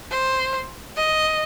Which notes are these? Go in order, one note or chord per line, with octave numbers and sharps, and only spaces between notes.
C5
D#5